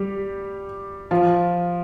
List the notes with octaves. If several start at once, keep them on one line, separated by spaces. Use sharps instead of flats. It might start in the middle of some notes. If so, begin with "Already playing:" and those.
Already playing: G3 G4
F3 F4